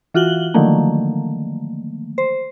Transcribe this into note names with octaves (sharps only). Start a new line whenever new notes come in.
E3 F4 F#4 F#7 G7
D3 D#3 F3 F#3 A3 A#3
C5